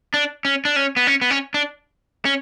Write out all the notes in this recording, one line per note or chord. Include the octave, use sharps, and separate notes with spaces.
D4
C#4
D4
C#4
B3
C#4
B3
C#4
D4
C#4